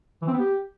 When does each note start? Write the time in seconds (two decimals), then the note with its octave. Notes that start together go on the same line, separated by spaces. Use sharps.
0.22 E3
0.28 C4
0.34 B3
0.39 G4